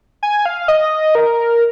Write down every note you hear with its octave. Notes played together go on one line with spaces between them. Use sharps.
G#5
F5
D#5
A#4